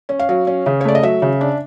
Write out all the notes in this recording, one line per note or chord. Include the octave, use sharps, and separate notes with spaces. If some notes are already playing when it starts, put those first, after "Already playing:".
C#4
F5
F#3
C#4
C#3
C#5
A3 D5
D#5
F#3 E5
C#3
D4